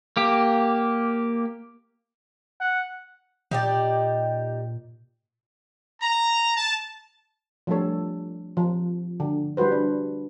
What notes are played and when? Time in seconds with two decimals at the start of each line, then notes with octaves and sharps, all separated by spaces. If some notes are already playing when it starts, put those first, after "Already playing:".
0.17 A#3 G4
2.60 F#5
3.51 A#2 D#4 G4 D5
6.01 A#5
6.56 A5
7.67 F3 G3 A3 D4 A4 C#5
8.57 F3
9.20 D3
9.57 G3 E4 F#4 B4 C5
9.72 D4